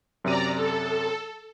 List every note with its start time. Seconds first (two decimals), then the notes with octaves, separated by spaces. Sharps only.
0.24 F#2 C3 D5 A#5 D#7
0.55 A4